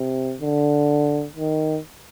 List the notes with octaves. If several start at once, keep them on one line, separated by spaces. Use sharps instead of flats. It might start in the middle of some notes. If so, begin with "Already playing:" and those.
Already playing: C3
D3
D#3